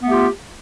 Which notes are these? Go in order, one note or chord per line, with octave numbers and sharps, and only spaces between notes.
A3 B3 F4 G4